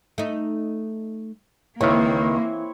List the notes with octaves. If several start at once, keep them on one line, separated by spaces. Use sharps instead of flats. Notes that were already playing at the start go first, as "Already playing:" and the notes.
A3 D#4
C#2 D#3 E3 A#3 C4 E4 C#5